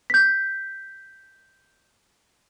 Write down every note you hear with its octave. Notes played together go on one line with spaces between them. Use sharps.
G6 B6